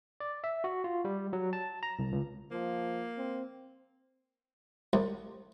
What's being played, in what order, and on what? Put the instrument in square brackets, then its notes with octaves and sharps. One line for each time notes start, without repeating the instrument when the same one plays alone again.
[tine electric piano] D5
E5
F#4
F4
G3
F#3
A5
A#5
C2
C#2
[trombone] F3 [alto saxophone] A#3
[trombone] C4
[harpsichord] C2